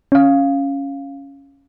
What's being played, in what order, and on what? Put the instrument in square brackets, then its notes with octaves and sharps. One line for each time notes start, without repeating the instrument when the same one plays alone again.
[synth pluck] C#4 F5